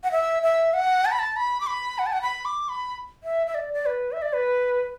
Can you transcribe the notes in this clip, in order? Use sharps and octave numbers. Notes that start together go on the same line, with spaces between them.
F#5
E5
E5
F#5
A5
B5
A5
B5
D6
B5
F#5
A5
F#5
B5
D6
B5
E5
E5
D5
D5
B4
E5
D5
B4